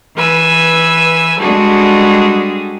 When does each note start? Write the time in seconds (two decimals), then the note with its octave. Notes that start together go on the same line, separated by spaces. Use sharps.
0.15 E3 B4 G#5 E6
1.39 G3 G#3 D4 F#4 G#4 A4